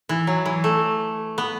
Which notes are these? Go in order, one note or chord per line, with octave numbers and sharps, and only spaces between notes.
E3
F#3
E3
A3
B3